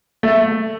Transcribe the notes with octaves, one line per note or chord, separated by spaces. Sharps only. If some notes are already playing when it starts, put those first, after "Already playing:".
A3